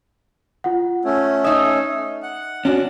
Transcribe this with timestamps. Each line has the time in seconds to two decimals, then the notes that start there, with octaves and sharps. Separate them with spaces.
0.64 F4 F#5
1.05 A3 C#4
1.44 D#4 E5 D#6
2.23 F#5
2.65 C#4 D4 F#4